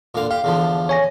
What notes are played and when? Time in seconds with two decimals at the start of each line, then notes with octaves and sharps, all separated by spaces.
0.15 A#2 D3 F5
0.31 G4 F5
0.44 E2 D3 F3
0.89 C#5 G#5 A#6